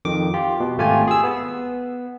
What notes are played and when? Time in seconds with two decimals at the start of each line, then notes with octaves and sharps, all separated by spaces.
0.05 F2 D#3 D6
0.34 F4 G4
0.60 B2
0.78 G#1 A3 F4 G4 G#5
1.08 G#4 E6
1.24 B3